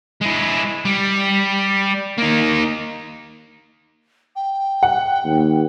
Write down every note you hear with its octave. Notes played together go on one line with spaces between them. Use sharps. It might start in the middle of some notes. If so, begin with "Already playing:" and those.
G#3 E4
G3
A#3 D#4
G5
F#5
D#2